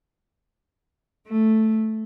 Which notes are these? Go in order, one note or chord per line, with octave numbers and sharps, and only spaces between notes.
A3